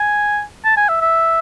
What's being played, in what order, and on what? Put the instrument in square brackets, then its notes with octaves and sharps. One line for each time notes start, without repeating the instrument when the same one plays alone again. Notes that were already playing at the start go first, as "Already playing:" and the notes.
Already playing: [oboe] G#5
A5
G#5
E5
E5